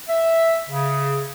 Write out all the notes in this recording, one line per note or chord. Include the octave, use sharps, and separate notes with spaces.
E5
C#3